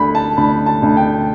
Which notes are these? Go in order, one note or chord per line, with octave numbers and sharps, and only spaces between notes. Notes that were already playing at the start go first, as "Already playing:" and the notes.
Already playing: D2 A3 B5
A5
D2 B5
A5
D2
G5